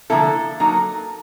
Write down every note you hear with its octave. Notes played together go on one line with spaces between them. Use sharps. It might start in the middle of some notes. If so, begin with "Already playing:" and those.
D3 F3 A#3 C#4 E4 A4
F#3 A#3 D#4